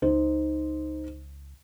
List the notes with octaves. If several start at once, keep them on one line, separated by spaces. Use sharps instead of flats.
C#2 D#4 C5